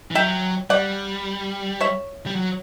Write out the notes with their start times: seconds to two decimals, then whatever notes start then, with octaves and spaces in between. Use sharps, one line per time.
0.11 E3
0.15 F#3 E5 G5
0.70 G3 D5 F#5
1.81 C#5 E5
2.26 G3
2.35 F#3